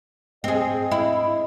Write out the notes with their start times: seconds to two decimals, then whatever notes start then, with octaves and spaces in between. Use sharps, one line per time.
0.44 C4 G#4 D#5
0.91 E4